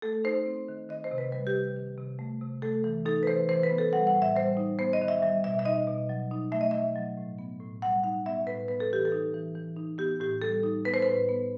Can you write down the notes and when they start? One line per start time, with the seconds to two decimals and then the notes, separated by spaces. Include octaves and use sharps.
0.02 A3 A4
0.24 D#4 C5
0.46 C4
0.68 D#3
0.89 D#3 D#5
1.04 C5
1.11 C3
1.18 B4
1.32 G3 B4
1.47 G4
1.55 C3
1.77 D#3
1.98 C3
2.19 A3
2.42 C3
2.62 A3 A4
2.84 E3
3.05 D#4 A4
3.23 B4
3.27 E3 C5
3.49 E3 C5
3.63 B4
3.70 B3
3.78 A4
3.93 G3 F#5
4.07 F#5
4.15 A2
4.22 E5
4.36 G3 C5
4.57 D#4
4.79 B3 C5
4.93 D#5
5.01 D#3
5.08 E5
5.22 G3 E5
5.44 B2 E5
5.59 E5
5.65 D#4 D#5
5.87 B2
6.09 F#3
6.31 D#4
6.52 A3 E5
6.61 D#5
6.71 B2 E5
6.96 F#3
7.17 A2
7.39 B3
7.60 A2
7.82 G3 F#5
8.04 D#4 F#5
8.26 B3 E5
8.47 A2 B4
8.68 B3 B4
8.80 A4
8.90 E3 G4
9.05 A4
9.12 D#4
9.34 E3
9.56 E3
9.77 D#4
9.98 B3 G4
10.20 A2 G4
10.42 G3 A4
10.63 D#4
10.85 B3 B4
10.94 C5
11.02 B4
11.08 A2
11.29 B3